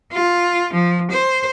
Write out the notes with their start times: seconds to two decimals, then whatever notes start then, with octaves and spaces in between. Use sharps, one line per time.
0.13 F4
0.73 F3
1.11 C5